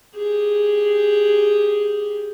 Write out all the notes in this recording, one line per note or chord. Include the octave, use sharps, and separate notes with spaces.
G4 G#4